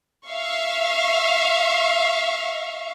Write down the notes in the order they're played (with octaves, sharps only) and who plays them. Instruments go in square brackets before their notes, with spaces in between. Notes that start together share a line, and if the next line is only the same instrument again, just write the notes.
[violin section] E5 F5 C#6